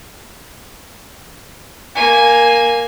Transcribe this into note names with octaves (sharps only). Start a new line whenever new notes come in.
A#3 G#5